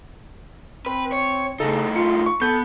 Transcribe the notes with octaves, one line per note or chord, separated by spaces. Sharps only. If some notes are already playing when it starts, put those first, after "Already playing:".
C4 B4
C#5
A2 C#3 D#4 A4
F4 C#7
C#6
B3 A4 G6